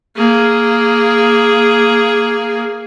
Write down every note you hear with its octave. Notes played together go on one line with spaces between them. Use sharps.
A#3 G#4